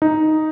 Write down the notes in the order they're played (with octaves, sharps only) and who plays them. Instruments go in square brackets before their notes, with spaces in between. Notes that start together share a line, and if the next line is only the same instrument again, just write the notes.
[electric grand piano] D#4